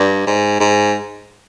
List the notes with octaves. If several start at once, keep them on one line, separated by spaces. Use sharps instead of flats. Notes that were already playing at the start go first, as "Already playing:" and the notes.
Already playing: G2
G#2
G#2